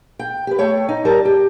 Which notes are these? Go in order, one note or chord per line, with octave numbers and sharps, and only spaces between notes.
G5
G4 B4
A3 C#5 G5
D#4
G3 A#4 A5
G4